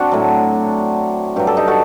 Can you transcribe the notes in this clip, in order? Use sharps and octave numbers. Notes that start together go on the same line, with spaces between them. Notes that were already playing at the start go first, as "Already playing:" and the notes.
Already playing: C4 D4 F#4
A2 F#3
G2 F#3 G4
A4
D#4 G4
F#4 A4